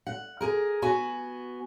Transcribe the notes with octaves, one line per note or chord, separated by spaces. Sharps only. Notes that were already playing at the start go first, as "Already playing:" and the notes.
F#5
G#4 A#4
B3 F#4 G#5